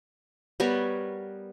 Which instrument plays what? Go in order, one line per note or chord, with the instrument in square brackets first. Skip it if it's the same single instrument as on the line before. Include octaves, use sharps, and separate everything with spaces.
[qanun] G3 B3 A#4 C#5